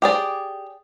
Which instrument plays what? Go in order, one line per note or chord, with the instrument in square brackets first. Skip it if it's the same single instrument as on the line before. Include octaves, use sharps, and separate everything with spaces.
[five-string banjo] G4 G#4 D5